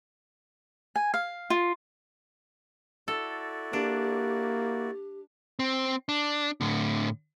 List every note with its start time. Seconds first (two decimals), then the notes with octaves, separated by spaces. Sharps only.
0.96 G#5
1.14 F5
1.50 F4
3.08 E4 F#4 A4 D5
3.73 A#3 D4 G4
5.59 C4
6.09 D4
6.61 A2 D3